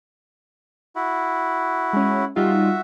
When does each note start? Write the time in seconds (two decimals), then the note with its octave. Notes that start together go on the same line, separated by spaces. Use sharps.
0.96 E4 F#4
1.93 G#3 C#4
2.36 G3 D#4 F4 F#4 E5